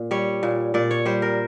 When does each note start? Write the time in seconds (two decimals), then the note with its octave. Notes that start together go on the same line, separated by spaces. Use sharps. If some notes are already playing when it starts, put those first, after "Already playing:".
Already playing: A#2
0.11 G3 C#5
0.43 A#2
0.74 A#2 D5
0.91 C#5
1.06 G3 C5
1.22 A#4